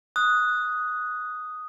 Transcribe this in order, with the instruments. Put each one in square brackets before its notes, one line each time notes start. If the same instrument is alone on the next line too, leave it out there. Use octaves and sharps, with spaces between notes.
[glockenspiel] D#6 [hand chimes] F#6